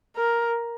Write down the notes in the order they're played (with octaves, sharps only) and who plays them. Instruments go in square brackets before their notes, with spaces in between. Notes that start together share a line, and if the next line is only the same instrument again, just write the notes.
[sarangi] A#4